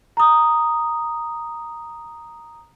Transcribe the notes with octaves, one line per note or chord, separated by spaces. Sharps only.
A#5 D#6